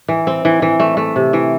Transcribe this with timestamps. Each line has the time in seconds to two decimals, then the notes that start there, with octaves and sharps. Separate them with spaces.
0.08 E3
0.27 C4
0.45 E3
0.62 E3
0.80 A3
0.97 A3
1.16 C3
1.33 E3